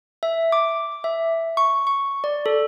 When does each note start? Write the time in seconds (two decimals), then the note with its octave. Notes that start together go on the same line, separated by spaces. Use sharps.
0.23 E5
0.52 D6
1.04 E5
1.57 C#6
1.87 C#6
2.24 D5
2.46 A4